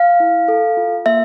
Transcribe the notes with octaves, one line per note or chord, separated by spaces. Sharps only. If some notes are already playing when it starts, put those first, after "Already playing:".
Already playing: F5
E4
A4
F4
A#3 E5